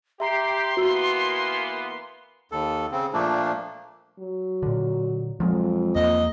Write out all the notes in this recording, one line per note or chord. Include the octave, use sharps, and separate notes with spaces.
G4 E5 A#5 C6 C7
E3 A#3 B3 F#4 E6
D#2 A4
C#3 C4
A#2 F3 A3 A#3 D4
F#3
A#2 D3
F2 F3 F#3 G#3
E2 A#3 D#5